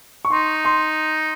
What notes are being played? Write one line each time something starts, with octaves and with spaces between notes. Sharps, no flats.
C#6
D#4 C6
C6